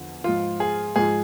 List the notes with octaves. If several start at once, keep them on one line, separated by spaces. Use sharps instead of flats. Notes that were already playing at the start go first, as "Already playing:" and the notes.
Already playing: E2 D3 F3
G#2 F3 F4
G#4
G#2 F3 G#4